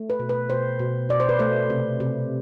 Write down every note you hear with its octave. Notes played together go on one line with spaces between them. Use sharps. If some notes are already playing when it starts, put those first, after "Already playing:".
Already playing: A3
B4
B2
B4
B2 C5
B2
B2 D5
C5
B4
A3 C5
C3
C3